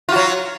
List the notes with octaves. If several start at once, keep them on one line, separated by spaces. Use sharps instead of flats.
F#3 F4 F#4